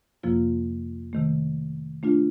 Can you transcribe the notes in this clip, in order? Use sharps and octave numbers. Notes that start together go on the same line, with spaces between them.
F2 C3 F3 A#3 F4
C3 D#3 A3
A3 D4 F4